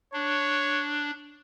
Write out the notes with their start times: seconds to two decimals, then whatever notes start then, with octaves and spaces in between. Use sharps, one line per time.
0.13 D4 C#5